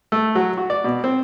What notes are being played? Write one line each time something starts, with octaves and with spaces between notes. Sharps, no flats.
A3
F#3
F#4
D5
B2
C4